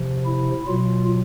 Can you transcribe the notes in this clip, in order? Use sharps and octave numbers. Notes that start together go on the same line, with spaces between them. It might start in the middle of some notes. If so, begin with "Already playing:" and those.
Already playing: C3 F3
E4
B2 F#3 F4